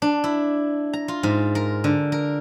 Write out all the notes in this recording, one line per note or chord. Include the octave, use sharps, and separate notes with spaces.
D4
E4
A#5
F4
G#2
A#4
D3
A#4